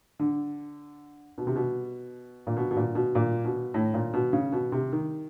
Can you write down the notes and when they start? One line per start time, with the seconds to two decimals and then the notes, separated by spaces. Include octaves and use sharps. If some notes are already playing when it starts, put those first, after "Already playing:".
0.19 D3
1.38 B2
1.47 C3
1.56 B2
2.47 A#2
2.57 B2
2.71 B2
2.76 A#2
2.95 B2
3.15 A#2
3.45 B2
3.74 A2
3.94 A#2
4.13 B2
4.33 C#3
4.52 B2
4.72 C3
4.93 D#3